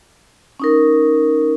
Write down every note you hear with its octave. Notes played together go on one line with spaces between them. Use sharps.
C#4 D#4 A#4